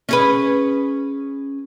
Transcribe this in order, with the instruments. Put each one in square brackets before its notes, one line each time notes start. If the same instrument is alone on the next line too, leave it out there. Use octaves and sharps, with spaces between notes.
[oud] C#4 G#4 B4